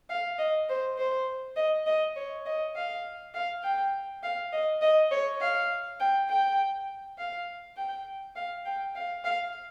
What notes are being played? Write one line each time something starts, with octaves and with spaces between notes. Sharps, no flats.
F5
D#5
C5
C5
D#5
D#5
C#5
D#5
F5
F5
G5
F5
D#5
D#5
C#5
F5
G5
G5
F5
G5
F5
G5
F5
F5